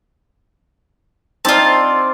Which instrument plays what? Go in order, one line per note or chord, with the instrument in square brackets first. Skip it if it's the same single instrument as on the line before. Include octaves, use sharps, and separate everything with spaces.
[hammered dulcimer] C4 D#4 D5 [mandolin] F4 A5